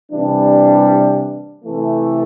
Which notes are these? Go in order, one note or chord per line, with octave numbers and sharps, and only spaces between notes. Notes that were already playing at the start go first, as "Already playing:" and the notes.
C3 E3 G3 D4
C3 E3 A3